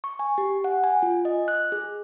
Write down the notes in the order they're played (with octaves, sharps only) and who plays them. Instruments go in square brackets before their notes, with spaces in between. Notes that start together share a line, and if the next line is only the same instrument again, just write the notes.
[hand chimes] C#6
G#5
G4
F#5
G#5
F4
D#5
F#6
G#4